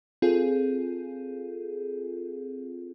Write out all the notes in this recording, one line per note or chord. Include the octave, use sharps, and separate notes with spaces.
C4 F4 G#4 A4